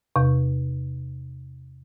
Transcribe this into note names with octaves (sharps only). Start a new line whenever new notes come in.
E2 C3